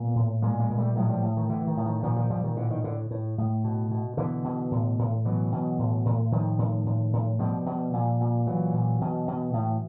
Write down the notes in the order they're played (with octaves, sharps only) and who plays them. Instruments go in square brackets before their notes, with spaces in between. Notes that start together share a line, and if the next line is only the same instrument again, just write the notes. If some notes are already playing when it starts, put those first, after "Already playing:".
Already playing: [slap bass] A#2 A3 B3
A2
A#2 G#3 A#3
G#3 A#3
A#2
G3 A3
A2 F#3 G#3
F3 G3
A2
D#3
A2 D3 E3
D#3
A2
D#3
A#2 D#3 F3
D#3 F3
A#2 F3 G3
D#3
A2 D3
D#3
A2 D3
A2
A2
B2
B2
B2 D3 E3
B2
A2
A2
B2 E3 F#3
B2
A2
A2
A2 D#3 F3
A2
A2
A2
B2 F3 G3
B2
A#2
A#2
A#2 E3 F#3
A#2
B2
B2
A2